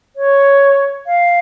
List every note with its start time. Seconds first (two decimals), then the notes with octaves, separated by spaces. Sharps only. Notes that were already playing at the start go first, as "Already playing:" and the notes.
0.16 C#5
1.06 F5